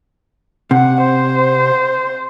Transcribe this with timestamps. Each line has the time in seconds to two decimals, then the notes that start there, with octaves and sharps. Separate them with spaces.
0.71 C3 F#5
1.02 C5